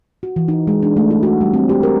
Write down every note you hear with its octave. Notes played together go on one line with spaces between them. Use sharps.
F#4
E3
D#4
G#3
D4
A3
E4
F#4
G3
C4
G4
A#4